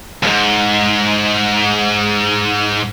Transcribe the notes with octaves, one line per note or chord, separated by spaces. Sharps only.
D#2 G#2